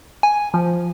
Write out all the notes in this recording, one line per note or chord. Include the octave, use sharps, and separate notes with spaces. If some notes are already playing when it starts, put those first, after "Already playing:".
G#5
F3